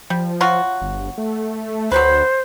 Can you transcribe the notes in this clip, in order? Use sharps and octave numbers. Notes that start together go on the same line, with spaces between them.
F3 G3
F#3 F4 F#4
G1
A3
D2 F#3 G3 B4 C5